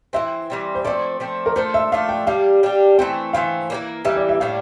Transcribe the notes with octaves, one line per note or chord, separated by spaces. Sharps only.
E3 G3 C4 E5
E3 G3 C4
C5
F3 A3 C4 D5
F3 A3 C4
A#4
A3 D4 F4 A4 C5
E5
A3 D4 F4 A4 F5
G5
G3 D4 G4 F5
G3 D4 G4
E3 A3 C4 G5
E3 A3 C4 F5
E3 G3 A#3
E3 G3 A#3 E5
D5
E5
A2 G3 D4 F5